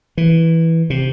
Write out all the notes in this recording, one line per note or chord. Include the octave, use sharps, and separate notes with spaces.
E3
C3